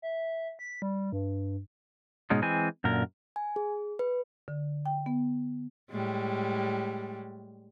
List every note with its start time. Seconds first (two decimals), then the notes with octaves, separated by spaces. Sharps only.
0.02 E5
0.59 B6
0.82 G3
1.13 G2
2.30 G#2 B2 G#3 C#4 D#4
2.42 E3 G#3 C4 G#5
2.84 F#2 A#2 D3 A#4
3.36 G#5
3.56 G#4
3.99 B4
4.48 D3
4.86 G5
5.06 B3
5.91 A2 G3 G#3